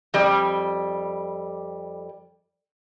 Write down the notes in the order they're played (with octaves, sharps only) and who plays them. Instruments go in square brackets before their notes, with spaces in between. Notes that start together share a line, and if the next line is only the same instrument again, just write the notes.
[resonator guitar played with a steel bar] F2 G3